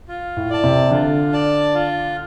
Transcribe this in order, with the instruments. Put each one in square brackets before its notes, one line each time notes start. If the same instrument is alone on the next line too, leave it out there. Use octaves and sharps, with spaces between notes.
[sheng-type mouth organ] F4
[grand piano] A2
[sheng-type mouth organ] D5 A5
[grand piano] C3
[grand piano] D3 [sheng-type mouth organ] F4
[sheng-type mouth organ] D5 A5
F4